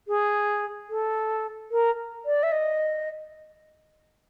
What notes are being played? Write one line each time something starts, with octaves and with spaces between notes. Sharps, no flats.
G#4
A4
A#4
D5
E5
D#5